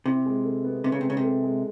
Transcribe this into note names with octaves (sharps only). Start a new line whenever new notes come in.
C3 E4
G#3
A4
B3
C3 B3
C#3
C3 G#3
C#3
C3
A4
G#3